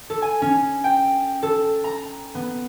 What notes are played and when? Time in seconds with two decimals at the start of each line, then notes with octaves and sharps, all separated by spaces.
0.10 A4
0.22 G#5
0.42 C#4
0.84 G5
1.43 A4
1.84 A#5
2.35 B3